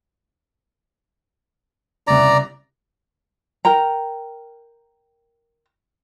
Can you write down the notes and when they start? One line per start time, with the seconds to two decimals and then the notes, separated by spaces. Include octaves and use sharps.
2.07 F#1 C2 D5 A#5
3.65 A#4 G5 A#5